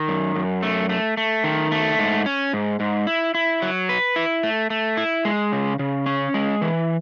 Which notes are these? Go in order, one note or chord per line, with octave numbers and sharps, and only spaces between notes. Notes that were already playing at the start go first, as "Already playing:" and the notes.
Already playing: D#3
F#2
F#2
A3
A3
A3
D#3
A3
G#2
C#4
G#2
G#2
E4
E4
F#3
B4
E4
A3
A3
E4
G#3
C#3
C#3
C#4
G#3
E3